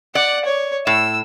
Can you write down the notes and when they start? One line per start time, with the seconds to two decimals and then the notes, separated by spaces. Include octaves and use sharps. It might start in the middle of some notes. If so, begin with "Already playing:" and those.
0.15 D5 F#5
0.45 C#5
0.87 A2 E6